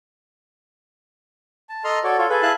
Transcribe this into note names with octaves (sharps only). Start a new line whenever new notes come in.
A5
A4 D#5 A#5 C6 F6
F#4 A4 C#5 D5
F4 A4 C#5
G#4 A4 B4
E4 G#4 F5 A5 F#6